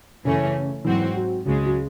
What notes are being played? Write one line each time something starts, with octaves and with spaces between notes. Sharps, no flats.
F#2 C#3 E3 A3 C#4
G#2 E3 F#3 C4 F#4
F#3
C#2 C#3 F#3 G#3
F#3